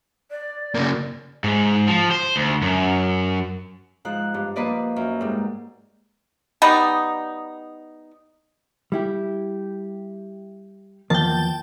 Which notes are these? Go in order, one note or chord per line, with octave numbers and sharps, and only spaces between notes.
D5
C#3 A#3
G#2
F3
C5
D2
F#2
G#2 F3 F#6
G2
F3 A#3 B4 D5 D#5
F#2
G#2 G3
G3 B3 D#4
G3 E4 G4
E2 D#3 F3 A#3 G5 A5